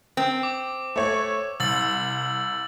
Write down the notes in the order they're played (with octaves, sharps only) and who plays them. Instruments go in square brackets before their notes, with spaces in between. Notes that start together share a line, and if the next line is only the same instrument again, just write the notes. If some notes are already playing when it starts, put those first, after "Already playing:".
[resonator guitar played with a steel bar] C4
[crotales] D6
[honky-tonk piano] A3 C#5
[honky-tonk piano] C2 [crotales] E6 A6 F#7